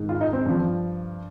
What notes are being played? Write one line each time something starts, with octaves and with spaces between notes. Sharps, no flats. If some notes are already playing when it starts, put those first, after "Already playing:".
Already playing: G#2 D#3
F4
D#4
C4
G2 F3